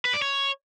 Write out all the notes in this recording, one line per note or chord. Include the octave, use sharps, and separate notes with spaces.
B4
D5
C#5